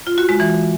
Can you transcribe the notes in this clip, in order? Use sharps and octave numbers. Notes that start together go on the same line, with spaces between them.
F4
F#4
G#3
E3